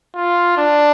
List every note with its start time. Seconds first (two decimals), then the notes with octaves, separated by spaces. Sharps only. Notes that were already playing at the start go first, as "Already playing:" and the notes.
0.15 F4
0.58 D4